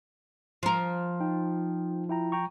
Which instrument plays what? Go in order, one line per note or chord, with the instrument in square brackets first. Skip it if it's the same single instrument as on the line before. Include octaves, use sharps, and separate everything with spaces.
[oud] F3 A#4
[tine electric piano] D#4 G5
E4 G5 A#5
G5 A#5 C#6